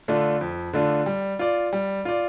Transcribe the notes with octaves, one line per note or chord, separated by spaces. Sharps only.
D3 A3 D4 F4
F2
D3 A3 D4 F4
G3
F4 D5
G3
F4 D5